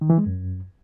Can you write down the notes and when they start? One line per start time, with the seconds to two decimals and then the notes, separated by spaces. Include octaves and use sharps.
0.01 D#3
0.10 E3
0.18 G#3
0.26 F#2